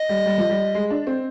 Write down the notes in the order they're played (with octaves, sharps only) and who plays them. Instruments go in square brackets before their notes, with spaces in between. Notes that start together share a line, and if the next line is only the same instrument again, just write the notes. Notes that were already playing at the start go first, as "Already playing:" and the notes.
Already playing: [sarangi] D#5
[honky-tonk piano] G3
G3
F3
G3
G#3
D4
C4